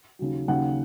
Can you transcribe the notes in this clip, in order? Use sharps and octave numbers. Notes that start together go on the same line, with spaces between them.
D#2 C#3 F#3
D#2 C#3 F#3 F#5